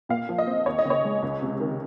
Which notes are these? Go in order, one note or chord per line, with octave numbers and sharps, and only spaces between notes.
A#2 F5
F3
D#5
C4
D#2 C#5
D#5
C#3
C#5
G#3
C#2
C3
D#3